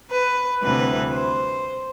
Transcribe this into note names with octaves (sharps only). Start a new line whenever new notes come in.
B4
D2 C3 E3 G3 B4
C5